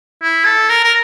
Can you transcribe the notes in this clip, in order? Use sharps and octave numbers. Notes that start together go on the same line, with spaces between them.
E4
A4
A#4
A#4